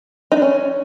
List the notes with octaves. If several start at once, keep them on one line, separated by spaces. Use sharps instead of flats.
D#4
D4
C#4